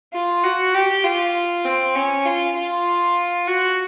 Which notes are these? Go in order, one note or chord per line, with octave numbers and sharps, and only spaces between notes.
F4
F#4
G4
F4
C4
C#4
F4
F4
F#4